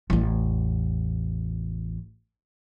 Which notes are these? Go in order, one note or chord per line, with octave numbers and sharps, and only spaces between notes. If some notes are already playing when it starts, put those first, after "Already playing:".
A1 E2